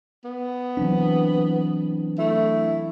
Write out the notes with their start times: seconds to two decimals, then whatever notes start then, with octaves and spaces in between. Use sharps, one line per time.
0.25 B3
0.77 E3 F#3 C4 D4
2.19 A3 E4